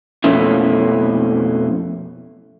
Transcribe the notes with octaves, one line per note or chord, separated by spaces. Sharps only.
F2 B2 A3 A#3 C#4 E4